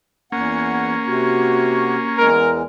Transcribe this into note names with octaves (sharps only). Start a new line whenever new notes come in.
E2 A#3 C#4 F#5
C3 F#4
E2 G#3 A#4